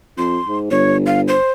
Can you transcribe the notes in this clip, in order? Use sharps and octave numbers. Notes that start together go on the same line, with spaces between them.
F2 C6
G#2
G1 C#5
F5
C5